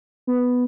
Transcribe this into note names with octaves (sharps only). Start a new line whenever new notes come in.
B3